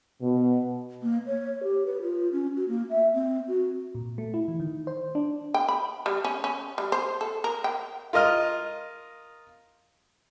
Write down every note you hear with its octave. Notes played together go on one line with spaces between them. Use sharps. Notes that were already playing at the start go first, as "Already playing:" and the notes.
B2
A#3
C#5
G4
B4
F4
C#4
F#4
A#3
E5
C4
F#4
A#2
A3
E4
E3
D#3
C5
D4
G5
B5
G3
C#4
C#4
G3
C5
A4
A#4
G5
F4 A#4 D#5 F6